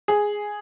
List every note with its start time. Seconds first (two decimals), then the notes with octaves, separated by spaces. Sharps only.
0.08 G#4